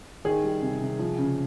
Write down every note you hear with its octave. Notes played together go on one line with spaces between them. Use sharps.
D#3 G#4
G3
C3
C3
F3
C#3